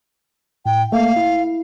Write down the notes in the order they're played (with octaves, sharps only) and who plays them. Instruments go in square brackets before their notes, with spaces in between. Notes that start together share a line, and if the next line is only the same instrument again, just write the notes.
[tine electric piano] A2 [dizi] G5
[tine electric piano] A3 A#3 [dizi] F5
[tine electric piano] E4